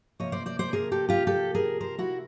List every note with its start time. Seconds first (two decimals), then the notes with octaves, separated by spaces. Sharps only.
0.19 C3 F3 A#3 C#5 D#5
0.32 C5 D5
0.46 C5 D5
0.59 C5 D5
0.73 G#4 A#4
0.92 G4 A4
1.09 F4 G4
1.27 G4 A4
1.55 G#4 A#4
1.80 A#4 C5
1.98 E4 F#4